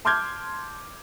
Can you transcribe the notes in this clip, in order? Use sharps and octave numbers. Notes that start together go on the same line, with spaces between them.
A5 C6 D6 F6 G6 G#6